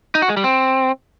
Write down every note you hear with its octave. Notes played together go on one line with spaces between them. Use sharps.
D#4
F#4
G#3
G3
C4